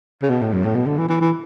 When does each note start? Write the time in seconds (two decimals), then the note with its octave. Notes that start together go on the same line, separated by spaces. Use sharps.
0.22 C#3
0.29 B2
0.42 A2
0.53 F#2
0.65 A2
0.75 B2
0.86 D3
0.98 E3
1.08 E3
1.21 E3